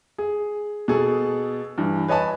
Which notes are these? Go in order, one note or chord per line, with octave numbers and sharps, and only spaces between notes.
G#4
B2 G#4 A4
G2 E3
B4 C#5 D#5 G#5 A5 B5